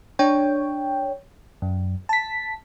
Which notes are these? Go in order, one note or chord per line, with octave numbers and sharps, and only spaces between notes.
D4 C#5 G5
F#2
A5 B6